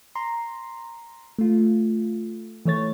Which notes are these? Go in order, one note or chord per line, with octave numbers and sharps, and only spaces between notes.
A#5 C6
A3 F4
E3 A3 C#5 A6